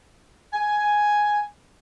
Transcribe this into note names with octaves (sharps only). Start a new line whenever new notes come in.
G#5